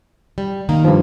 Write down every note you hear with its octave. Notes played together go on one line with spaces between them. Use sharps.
G3
D#3 A#3 A#4
G2 F3